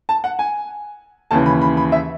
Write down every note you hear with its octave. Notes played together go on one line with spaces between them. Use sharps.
A5
F#5
G#5
D#2 C#3 E3 A5
B5
B5
B5
E5